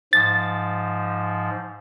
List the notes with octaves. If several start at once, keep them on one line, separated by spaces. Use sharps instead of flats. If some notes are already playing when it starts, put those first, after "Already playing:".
G#2 F3 A6